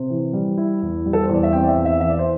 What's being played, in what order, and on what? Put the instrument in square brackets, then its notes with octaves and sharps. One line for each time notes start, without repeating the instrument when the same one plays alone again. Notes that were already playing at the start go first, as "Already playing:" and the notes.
Already playing: [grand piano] C3 C5
E3
G3
E4
E2
G3
A4
C5
E2 D5
E5
C4 G5
D5
E5
E2
E5
E3 E5
D5
C5